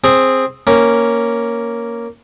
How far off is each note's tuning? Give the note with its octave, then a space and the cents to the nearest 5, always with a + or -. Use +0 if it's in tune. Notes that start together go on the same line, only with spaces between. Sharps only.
C4 +5 G#4 -5
A#3 +0 C#4 +0